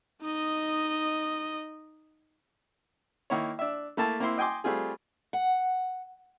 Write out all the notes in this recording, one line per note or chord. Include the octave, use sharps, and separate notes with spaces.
D#4 D#5
D#3 A#3 E4 C#5
D4 E5
A3 A#3 E4 A5
A#3 C4 E4 C6
D#5 G5 G#5 C6 D6
G3 A3 C4 F4 G#4
F#5